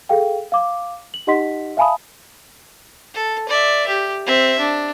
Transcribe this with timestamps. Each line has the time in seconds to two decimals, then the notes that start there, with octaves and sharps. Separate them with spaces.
0.09 G#4 A4 F5 G5
0.52 F5 D6
1.14 F#7
1.27 D#4 G4 D#5 F#5 C6 B6
1.77 E5 F5 G#5 A5 B5 D#6
3.14 A4
3.48 D5 E5
3.88 G4
4.26 C4 E5
4.59 D4